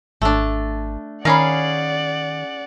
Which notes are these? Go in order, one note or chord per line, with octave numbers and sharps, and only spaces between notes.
G#1 A3 D4
D#3 C#4 G#4 A#4 D5 F5 F#5 B5